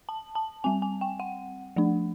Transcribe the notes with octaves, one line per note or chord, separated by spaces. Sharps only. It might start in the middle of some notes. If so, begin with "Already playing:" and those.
A5
A5
G3 C4 G#5
G#5
G5
F#5
F3 A3 D4